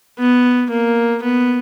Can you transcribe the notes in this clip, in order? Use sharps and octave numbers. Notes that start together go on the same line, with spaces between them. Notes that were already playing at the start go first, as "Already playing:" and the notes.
B3
A#3
B3